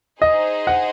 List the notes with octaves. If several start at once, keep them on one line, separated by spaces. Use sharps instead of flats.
D#4 G#4 C5 D#5
F#5